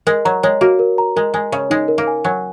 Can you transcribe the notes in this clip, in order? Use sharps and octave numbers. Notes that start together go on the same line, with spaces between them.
G#3 A#4
F#3 A#5
G#3 C#5
A#3 F#4
A#4
A#5
G#3 A#4
G#3 G#5
C#3 C#5
G#3 D#4
A#4
A#3
G#5
F#3 G#5